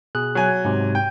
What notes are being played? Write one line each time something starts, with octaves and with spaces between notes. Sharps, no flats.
B2 G#4 F#6
F#3 G#5
G#2 C3
G5